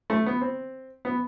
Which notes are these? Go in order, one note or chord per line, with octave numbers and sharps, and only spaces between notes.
A3
B3
C4
B3